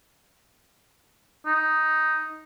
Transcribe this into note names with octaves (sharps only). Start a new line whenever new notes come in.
D#4